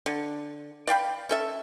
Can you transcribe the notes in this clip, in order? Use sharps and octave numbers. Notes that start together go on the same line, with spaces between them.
D3
D5 F5 G5 B5
C#4 A4 E5